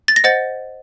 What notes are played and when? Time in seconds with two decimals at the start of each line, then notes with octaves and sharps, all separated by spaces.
0.08 A6
0.16 A#6
0.24 C5 D#5 F#5 A6